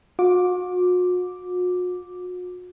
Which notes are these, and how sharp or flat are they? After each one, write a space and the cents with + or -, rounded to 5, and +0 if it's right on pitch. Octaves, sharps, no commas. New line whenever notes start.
F#4 -45 D6 +0